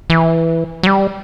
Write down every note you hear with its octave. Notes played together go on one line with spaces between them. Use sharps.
E3
F#3
G3